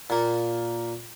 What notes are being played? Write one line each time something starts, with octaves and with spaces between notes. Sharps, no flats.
A#2 A#3